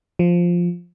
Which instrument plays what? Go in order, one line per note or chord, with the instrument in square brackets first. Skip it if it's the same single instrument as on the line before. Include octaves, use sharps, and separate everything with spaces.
[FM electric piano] F3